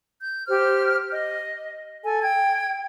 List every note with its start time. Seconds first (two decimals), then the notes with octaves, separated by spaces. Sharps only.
0.21 G6
0.48 G4 C5 F6
1.12 D#5
2.04 A4 G#5
2.22 G5 G#6